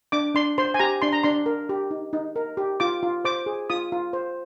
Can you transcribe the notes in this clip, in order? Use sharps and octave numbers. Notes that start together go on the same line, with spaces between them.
D4 D6
D4 C6
C5 C6
G#5
G4 A#5
D4 C6
A#5
D4 C6
A#4
G4
D#4
D#4
A#4
G4
F4 D6
F4
C5 D6
G#4
F4 D#6
F4
C5